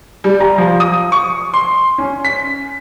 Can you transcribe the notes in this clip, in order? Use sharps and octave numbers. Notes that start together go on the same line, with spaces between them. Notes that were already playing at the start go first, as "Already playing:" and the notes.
G3
A#5
F3
D#6
C#6
C6
C#4
B6